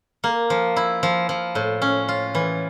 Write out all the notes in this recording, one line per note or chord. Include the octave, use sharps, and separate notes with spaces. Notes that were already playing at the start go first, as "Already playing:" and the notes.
A#3
F3
E4
F3
F3
A2
C#4
F4
E3